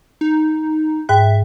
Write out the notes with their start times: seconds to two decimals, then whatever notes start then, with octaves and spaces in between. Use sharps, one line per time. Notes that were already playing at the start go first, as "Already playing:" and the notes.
0.21 D#4
1.09 G#2 E5 G5 F#6